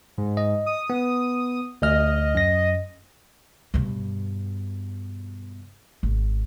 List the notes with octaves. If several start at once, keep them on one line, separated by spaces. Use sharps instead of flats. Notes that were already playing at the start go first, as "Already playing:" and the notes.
G#2
D#5
D#6
B3
D2 D#5 F6
F#2 A#6
G2 B2
G#1